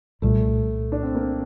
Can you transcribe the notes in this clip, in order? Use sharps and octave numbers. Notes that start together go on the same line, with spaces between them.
C2 A#2 G3 A3
D4
C4
A#3